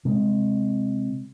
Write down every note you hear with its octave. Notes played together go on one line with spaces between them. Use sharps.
C3 G#3